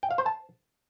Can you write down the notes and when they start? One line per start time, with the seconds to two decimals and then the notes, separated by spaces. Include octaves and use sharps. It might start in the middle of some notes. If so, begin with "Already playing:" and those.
0.03 G5
0.11 F5
0.18 C5
0.26 A5